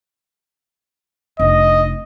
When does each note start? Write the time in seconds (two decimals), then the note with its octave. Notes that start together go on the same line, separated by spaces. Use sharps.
1.39 F1 D4 D#5